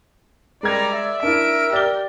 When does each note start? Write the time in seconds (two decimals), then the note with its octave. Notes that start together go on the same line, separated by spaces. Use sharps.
0.63 G3 G#3 A#4 D5 A#5 G#6
0.92 E5
1.23 D4 E4 A#4 D7
1.73 G4 D5 G7